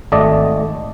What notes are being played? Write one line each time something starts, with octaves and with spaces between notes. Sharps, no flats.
G#1 A3 D5 D#5